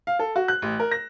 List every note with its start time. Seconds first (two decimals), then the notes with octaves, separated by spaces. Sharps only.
0.07 F5
0.19 A4
0.36 F#4
0.48 F#6
0.62 A1
0.80 A#4
0.91 A#6